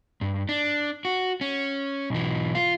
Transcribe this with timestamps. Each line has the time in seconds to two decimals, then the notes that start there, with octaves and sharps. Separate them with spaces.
0.21 G2
0.49 D4
1.05 F#4
1.41 C#4
2.10 B1 E3
2.55 F4